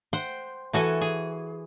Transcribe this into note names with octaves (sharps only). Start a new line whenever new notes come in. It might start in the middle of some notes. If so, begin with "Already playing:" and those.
C5 F#5 G5
E3 F#4 A4 G#5
G#4